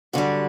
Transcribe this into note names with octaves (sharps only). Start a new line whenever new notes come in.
F#2 D3 G3 F#4